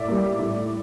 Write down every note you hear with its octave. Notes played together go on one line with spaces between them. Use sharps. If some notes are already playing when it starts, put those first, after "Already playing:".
Already playing: A2 D5 E5
G3 A#3
A2